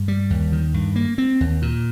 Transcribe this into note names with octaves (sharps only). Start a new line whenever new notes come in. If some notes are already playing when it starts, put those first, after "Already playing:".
Already playing: G2
G3
D#2
D#3
G2
A#3
C4
D#2
A#2